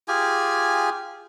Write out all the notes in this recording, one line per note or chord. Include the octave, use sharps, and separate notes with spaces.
F4 G4 G#4 G#5